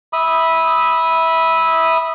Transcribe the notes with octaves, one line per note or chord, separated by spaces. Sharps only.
E5 B5 D#6